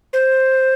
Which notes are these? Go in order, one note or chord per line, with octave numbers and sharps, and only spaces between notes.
C5